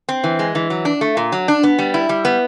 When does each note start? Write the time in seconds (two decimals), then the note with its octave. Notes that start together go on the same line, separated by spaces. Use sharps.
0.09 C4
0.24 E3
0.39 G#3
0.55 E3
0.70 F#3
0.85 D4
1.01 A3
1.17 A#2
1.32 F#3
1.48 D4
1.63 B3
1.79 G3
1.94 E4
2.09 G3
2.25 B3